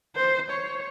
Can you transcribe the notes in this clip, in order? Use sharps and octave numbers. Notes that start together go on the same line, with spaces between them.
C5
C#5